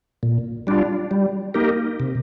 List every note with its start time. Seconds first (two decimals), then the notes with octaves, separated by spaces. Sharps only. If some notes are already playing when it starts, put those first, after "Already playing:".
0.23 A#2
0.67 G3 D4 F4
1.11 G3
1.54 A#3 D#4 G4 A#4
2.00 C3